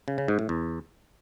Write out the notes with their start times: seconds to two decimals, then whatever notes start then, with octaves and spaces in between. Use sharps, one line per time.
0.08 C#3
0.18 C#3
0.28 G#2
0.39 A2
0.49 E2